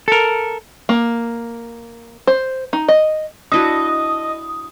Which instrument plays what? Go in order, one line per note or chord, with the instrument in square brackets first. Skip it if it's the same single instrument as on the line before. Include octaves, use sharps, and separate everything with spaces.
[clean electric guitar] A4 A#4
[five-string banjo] A#3
C5
D#4
D#5
[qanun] D4 E4 F#4 [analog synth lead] D#5 [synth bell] D#6